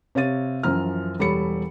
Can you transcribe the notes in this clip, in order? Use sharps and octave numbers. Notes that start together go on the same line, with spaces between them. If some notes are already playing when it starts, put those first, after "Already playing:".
C3 C#5 F5 A6 D#7
F#2 E3 F3 A#5 F6
E1 G3 A4 C#5 B5 C#7